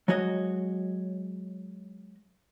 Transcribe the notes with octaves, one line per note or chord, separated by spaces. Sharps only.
F#3 G#3 F#4 C#5 D#5